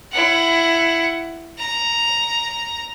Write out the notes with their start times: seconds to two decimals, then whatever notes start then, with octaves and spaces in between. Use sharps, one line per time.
0.12 E4 F#5
1.59 A#5